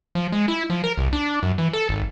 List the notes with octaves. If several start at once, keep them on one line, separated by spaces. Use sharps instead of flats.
F3
G#3
E4
F3
A#4
C2
D4
F#2
E3
A4
G#1